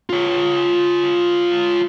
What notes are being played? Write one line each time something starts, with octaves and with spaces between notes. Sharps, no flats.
F4 C#5